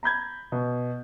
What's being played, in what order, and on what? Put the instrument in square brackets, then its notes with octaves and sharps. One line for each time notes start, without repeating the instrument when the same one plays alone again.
[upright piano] A#5 B5 G6 G#6
B2